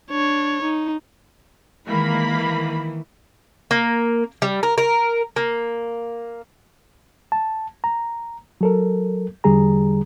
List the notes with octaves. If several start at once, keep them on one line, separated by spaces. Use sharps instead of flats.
D4 C#5
D#4
D#3 E3 G#3 A#3 B5
D#3 E3
A#3
G3
A#4
A#4
A#3
A5
A#5
F#3 A4 A#4
E2 D3 G3 G#4 A#5